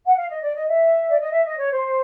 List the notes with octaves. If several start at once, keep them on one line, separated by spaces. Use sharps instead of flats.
F#5
F5
D#5
D5
D#5
E5
D5
D#5
E5
D#5
C#5
C5